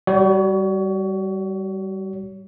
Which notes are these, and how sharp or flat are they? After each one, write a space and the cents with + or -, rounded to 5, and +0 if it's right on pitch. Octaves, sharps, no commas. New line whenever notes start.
G3 -10 F#4 +40 C#5 +30